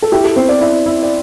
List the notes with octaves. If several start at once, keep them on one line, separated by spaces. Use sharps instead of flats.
A4
E4 G4
A4
C4 C5
D5
E4 D5
E4
D5